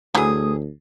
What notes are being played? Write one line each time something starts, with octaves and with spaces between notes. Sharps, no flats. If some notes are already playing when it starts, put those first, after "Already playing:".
D2 G2 E3 F#3 A3 G#4 D#6